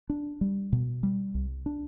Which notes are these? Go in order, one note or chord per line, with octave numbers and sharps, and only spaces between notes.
D4
G3
B2
G3
C2
D4